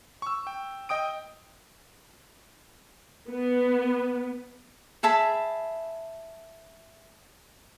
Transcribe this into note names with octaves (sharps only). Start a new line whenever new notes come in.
C#6 E6
G5
D#5 G5 D#6 D7
B3
G#4 E5 A5 B5